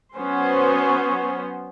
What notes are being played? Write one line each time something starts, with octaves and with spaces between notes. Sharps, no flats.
F#3 B3 C#4 C5